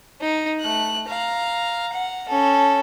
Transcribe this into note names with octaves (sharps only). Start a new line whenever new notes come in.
D#4
A3 F#6
F5 A#5
F#5
C#4 A4